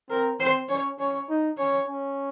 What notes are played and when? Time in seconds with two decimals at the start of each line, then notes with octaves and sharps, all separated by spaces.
0.10 C4 A#4
0.40 C4 C5
0.69 C#4 C#5
0.99 C#4 C#5
1.29 D#4
1.58 C#4 C#5
1.88 C#4